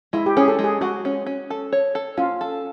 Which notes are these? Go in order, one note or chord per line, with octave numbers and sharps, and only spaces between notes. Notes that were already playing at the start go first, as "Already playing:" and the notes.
G#3 E4
G4
C#4 G#4
A4
G#3
G#4
G#3 F#4
C#4
C#4
A4
C#5
A4
C#4 F4
A4